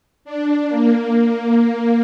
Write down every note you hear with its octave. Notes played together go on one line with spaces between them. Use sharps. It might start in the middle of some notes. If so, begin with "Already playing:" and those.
D4
A#3